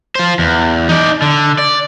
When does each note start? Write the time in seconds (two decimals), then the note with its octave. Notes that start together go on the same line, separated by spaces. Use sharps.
0.15 F4 C5
0.39 E2
0.89 D#4 D5
1.22 D3
1.58 D5